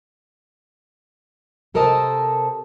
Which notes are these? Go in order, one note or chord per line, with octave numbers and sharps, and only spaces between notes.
C3 A4 A#4 C5 D#5 A5